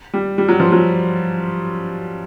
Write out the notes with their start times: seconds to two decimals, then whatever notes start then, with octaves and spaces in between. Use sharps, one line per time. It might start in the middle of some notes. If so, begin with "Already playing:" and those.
0.14 G3
0.38 G3
0.48 F#3
0.60 F3
0.72 F#3